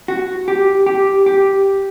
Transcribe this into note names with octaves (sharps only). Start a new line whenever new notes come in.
F#4
G4
G4
G4